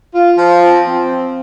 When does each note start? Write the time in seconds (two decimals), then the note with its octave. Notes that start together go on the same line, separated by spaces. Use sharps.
0.14 F4
0.38 F3
0.62 C4
0.85 C4